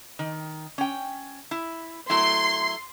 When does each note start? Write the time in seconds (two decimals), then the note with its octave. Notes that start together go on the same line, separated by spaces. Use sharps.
0.19 D#3
0.78 C#4 G5
1.51 E4
2.10 F#3 A3 E4 C6